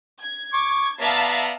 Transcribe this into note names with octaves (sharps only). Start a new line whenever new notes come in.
G#6
C#6 D6
B3 D5 E5 F5 A5 A#5